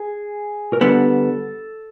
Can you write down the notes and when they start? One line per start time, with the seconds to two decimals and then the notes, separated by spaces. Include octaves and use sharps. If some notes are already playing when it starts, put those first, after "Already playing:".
Already playing: G#4
0.73 A#4
0.81 D3 G3 B3 A4